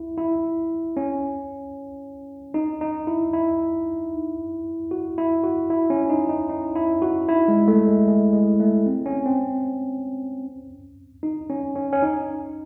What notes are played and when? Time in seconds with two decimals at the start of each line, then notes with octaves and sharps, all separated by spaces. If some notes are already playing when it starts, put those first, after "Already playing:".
Already playing: E4
0.17 E4
0.97 C#4
2.54 D#4
2.81 D#4
3.07 E4
3.33 E4
4.91 F#4
5.18 E4
5.44 F#4
5.70 E4
5.90 C#4
6.10 D#4
6.29 D#4
6.49 D#4
6.75 E4
7.02 F#4
7.29 E4
7.48 G#3
7.68 A3
7.87 G#3
8.08 G#3
8.33 G#3
8.60 A3
8.86 C4
9.06 C#4
9.26 C4
11.23 D#4
11.50 C#4
11.76 C#4
11.92 C#4
12.03 D#4